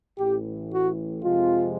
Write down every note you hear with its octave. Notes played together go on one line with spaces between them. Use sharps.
A1 A2 E3 G4
F#4
F2 C3 F3 G#3 F4